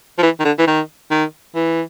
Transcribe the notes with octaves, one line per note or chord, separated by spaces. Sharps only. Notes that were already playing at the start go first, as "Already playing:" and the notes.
F3
E3
D#3
D3
E3
D#3
D#3
E3